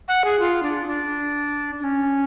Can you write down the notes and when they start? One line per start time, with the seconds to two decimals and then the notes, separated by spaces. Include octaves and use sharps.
0.08 F#5
0.24 G#4
0.39 F4
0.63 D4
0.87 D4
1.80 D4
1.84 C#4